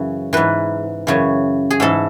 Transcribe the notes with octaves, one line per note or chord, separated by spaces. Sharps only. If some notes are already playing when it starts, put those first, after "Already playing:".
Already playing: F#2 C#3 E3
G#2 E3 B4
F#2 C#3 E3
G#4
G#2 E3 A4